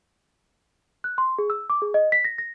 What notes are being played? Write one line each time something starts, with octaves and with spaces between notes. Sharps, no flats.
F#6
C6
G#4
E6
D6
G#4
D#5
B6
A#6
A#6